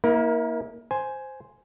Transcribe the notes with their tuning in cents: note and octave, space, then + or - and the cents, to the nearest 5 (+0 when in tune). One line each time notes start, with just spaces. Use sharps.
A#3 +10 E4 -35 A#4 +25
C5 +0 G#5 +5